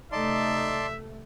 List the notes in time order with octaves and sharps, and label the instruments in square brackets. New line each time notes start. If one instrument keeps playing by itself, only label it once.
[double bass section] C3 A3 [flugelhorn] D#4 [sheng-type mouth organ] D5 A5 C6 [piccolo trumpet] E5